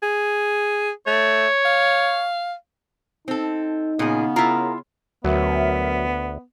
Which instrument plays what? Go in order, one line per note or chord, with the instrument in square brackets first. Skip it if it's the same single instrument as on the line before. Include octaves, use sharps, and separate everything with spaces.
[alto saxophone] G#4
[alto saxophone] A3 [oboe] C#5
[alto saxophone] F5
[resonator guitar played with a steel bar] C4 A4 [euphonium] D#4
[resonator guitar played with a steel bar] A#2 G#4 [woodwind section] C#3 B3
[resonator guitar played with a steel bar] E4 F4 [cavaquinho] A#4
[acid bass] D2 [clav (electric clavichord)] F#3 [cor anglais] B3 [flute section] A#4 C#5 E5